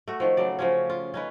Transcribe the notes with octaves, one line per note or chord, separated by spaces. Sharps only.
A3 F#4
D#3 F3
C#3 F#3 D5
C#3 F3 C#4
F4
C#4 D#4 B4